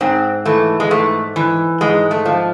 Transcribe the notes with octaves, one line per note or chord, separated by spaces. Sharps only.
G#2 C4
E3 A3
G#3
G#2 A3
E3
G#2 G#3
A3
F3